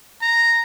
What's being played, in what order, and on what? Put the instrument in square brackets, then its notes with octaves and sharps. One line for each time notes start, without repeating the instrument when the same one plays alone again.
[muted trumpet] A#5